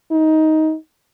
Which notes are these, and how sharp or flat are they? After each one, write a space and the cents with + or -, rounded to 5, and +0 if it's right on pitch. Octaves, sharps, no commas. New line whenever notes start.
D#4 +15